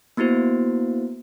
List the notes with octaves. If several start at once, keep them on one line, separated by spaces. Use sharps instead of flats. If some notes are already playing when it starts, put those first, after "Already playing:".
A#3 B3 E4 F#4 C5